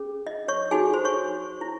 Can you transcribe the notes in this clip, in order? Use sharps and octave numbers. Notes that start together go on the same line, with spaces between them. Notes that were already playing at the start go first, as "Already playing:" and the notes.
Already playing: C#4 G#4
D#5
C#5 C#6
D#4 F#4 G#4 A4 G#5
C5 C6
C#5 C#6
E4